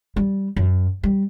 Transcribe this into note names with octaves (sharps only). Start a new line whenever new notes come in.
G3
F#2
G3